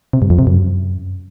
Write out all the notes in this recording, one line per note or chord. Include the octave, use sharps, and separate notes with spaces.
C3
G2
F2
C3
F#2